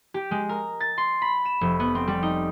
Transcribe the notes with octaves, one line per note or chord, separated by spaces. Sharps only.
G4
G#3
A#4
A6
C6
B5
E7
F1
B3
C4
G3
D#4